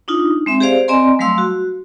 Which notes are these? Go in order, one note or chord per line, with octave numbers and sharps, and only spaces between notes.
D4 D#4 F4
G#3 C4 E5
G4 G#4 C5 D5 F5
C4 D5 D#5 G#5 A#5 C6
F#3 G3 A3 F5 C6 E6
F#4